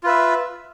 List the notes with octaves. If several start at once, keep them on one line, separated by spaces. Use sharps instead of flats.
F4 B4 E5